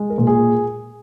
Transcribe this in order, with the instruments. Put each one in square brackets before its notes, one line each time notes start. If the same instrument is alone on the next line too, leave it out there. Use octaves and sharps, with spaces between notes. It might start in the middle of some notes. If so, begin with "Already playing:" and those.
Already playing: [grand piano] G#3
A#4
A#2
G#4